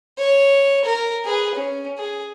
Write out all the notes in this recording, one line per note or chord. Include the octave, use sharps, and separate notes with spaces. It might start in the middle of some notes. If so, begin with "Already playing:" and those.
C#5
A#4
G#4 B4
C#4
G#4